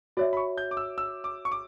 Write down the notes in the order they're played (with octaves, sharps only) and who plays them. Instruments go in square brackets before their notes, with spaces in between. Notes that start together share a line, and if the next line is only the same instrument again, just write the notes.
[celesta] F#4 C#5 E5 [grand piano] D5
[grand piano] B5
C#6
G6
D6
E6
E6
D6
C#6
D6